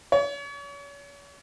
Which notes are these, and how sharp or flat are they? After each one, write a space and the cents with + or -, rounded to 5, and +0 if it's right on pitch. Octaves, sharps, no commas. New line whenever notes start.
C#5 +40